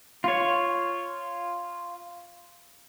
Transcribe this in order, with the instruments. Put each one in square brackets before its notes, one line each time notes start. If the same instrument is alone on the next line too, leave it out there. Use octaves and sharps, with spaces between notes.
[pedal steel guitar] F4 C#5